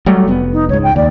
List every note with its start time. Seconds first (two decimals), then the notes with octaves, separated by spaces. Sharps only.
0.06 F#3 G3 A3
0.28 F1 B3
0.52 D#4
0.69 C#2 G#2 C#5
0.83 G5
0.96 D#2 D5